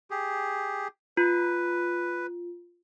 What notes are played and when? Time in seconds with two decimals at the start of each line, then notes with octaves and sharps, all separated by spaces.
0.11 G4 G#4
1.17 F4 B4